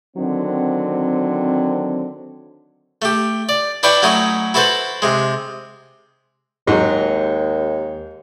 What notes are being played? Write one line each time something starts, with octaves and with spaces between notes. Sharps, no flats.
D3 D#3 F#3 C4
A3 G4
D5
D4 E4 B4 D5 G5 C#6
F#3 A3 C#4 D#4 E4
E4 F#4 A4 B4 C5
C3 G#3
D#2 G#2 F#3